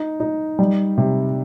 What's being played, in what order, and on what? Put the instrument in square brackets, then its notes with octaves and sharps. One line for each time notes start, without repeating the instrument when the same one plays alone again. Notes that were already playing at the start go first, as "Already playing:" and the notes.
Already playing: [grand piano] D#4
D#4
G3
C3